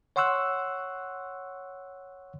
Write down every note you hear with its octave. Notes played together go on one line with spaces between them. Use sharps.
C#5 F#5 C6 C#6 E6 F#6